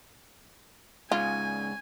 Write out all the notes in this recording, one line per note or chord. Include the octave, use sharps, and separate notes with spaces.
G#2 C#3 F4 G#5